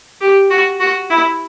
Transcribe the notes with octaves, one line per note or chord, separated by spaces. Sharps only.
G4
F#4
F#4
E4